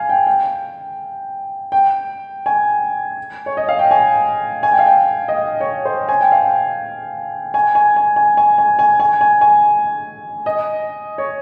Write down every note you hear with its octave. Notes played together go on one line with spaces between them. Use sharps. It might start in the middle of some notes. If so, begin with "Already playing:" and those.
Already playing: F5 G#5
G5
G5
G5
G#5
C#5
D#5
F5
G5
G#5
G#5
G5
F5
G5
D#5
F5
C#5
C5
G#5
G5
F5
G5
G#5
G#5
G#5
G#5
G#5
G#5
G#5
G#5
G#5
G#5
D#5
C#5